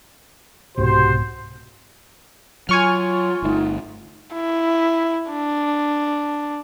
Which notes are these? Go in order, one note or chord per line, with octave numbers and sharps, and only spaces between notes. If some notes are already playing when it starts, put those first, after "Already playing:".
C2 G#2 B2 F#4 G4 C5
F#3 F4 G#5 C#6 F6
G1 C3 A3 D#4
E4
D4